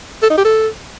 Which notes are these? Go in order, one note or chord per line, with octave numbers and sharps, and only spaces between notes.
A4
D#4
G4
A4